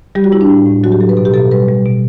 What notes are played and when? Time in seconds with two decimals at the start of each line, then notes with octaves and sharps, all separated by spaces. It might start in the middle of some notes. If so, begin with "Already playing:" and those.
0.15 G3 G4
0.24 F#4
0.32 G3 E4
0.41 D4
0.50 A2
0.66 A2
0.84 F#3 F#4
0.92 G4
1.01 F#3 A4
1.09 B4
1.17 B2 A4
1.25 G4
1.34 B2 A4
1.51 G3 B4
1.68 G3
1.85 B2